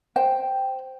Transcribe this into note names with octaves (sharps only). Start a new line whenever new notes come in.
C5 G5